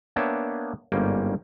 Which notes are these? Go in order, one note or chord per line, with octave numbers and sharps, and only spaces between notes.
A#3 B3 D4 C#5 E5 G5
G1 G#2 G3 A#3 C#4 G5